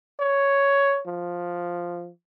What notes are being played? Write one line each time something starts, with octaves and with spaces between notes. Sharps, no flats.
C#5
F3